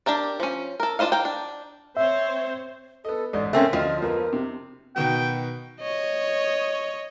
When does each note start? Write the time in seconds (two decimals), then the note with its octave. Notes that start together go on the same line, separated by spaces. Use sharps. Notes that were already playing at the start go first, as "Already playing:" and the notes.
0.06 D4 G4 A#4 D5
0.40 F3 C#4
0.80 A4 A#4
0.99 D4 F4 C5 D#5 F5
1.12 A#4 F5 G5
1.25 D4
1.97 C4 C5 C#5 E5
3.05 B3 A4 D#5
3.33 A1 G#2 D5 D#5
3.53 A3 A#3 C4 C#4 A#4
3.73 D2 F3 F4 D#5
4.02 F2 B3 A#4
4.33 C3
4.96 B2 D#3 B3 G5
5.80 C#5 D#5